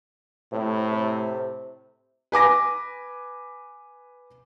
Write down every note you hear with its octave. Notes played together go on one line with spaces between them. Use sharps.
A2 C3
C3
B4 G#5 D6 A#6